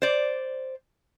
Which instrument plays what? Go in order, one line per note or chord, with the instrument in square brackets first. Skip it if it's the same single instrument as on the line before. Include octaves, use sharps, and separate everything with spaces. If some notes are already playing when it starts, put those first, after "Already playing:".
[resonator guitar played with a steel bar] C5 D5